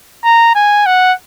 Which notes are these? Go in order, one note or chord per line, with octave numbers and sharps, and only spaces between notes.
A#5
G#5
F#5